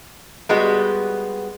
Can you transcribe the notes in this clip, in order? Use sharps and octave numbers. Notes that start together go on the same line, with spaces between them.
G3 G#3 B3 F#4